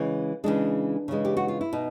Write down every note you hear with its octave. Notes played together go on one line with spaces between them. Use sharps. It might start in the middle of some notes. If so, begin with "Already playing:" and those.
Already playing: C#3 E3 G#3
C#3 E3 G#3 D4
C#3 E3 G#3
G4
F#4
F4
E4
B2 D#4